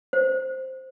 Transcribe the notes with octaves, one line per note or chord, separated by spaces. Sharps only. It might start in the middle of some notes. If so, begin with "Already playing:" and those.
C5